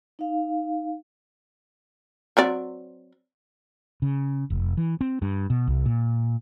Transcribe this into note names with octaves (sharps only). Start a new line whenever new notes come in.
D#4 F5
F#3 C4 D5
C#3
F1
E3
C4
G2
B2
C2
A#2